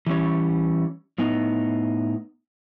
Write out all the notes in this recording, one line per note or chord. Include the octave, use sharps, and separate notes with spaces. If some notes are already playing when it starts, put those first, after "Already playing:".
E3 G3 C#4 C#5
A2 B3 D#4